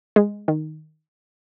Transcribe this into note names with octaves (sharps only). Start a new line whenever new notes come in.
G#3
D#3